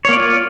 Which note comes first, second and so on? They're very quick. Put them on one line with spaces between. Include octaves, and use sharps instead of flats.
C#5 A#3 D5 F4